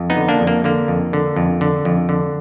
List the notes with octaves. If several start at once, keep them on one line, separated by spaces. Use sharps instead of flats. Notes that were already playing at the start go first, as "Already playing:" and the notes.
Already playing: F2
B3 D#4
D3
A#3 D4
F2
A#3
D3 A#3
F2
D3
F2
D3
F2
D3